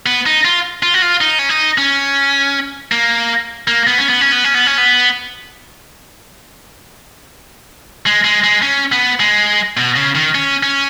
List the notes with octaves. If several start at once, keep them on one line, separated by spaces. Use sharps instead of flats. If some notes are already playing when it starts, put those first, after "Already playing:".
B3
D#4
F4
F4
F#4
F4
D#4
C#4
D#4
C#4
A#3
A#3
B3
C#4
B3
C#4
B3
C#4
B3
C#4
B3
G#3
G#3
G#3
C#4
B3
G#3
B2
C#3
D#3
C#4
C#4